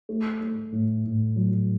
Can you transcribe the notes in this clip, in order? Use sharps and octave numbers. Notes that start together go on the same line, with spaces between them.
A3
A3
A2
A2
F#3